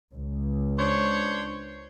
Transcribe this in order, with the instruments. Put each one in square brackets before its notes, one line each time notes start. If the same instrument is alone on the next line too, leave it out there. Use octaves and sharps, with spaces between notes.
[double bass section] C#2
[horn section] D4 C5 C#5